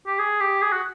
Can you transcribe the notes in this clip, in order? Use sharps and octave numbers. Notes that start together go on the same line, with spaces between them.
G4
G#4
G4
G#4
F#4